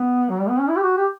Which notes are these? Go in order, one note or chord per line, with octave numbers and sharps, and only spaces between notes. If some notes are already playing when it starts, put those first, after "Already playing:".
Already playing: B3
F#3
G3
B3
C#4
E4
G4
F#4
G4